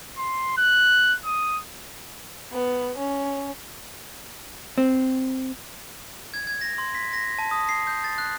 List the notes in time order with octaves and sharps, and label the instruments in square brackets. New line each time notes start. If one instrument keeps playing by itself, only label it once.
[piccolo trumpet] C6
F#6
D#6
[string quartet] B3
C#4
[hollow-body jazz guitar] C4
[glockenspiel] G#6
G#6
A#6
C6
B6
A#6
A5
D#6
C7
G6
A6
F#6